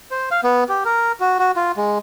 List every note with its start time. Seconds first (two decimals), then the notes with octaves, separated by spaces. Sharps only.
0.11 C5
0.31 F5
0.44 B3
0.69 G4
0.85 A#4
1.20 F#4
1.39 F#4
1.56 F4
1.77 G#3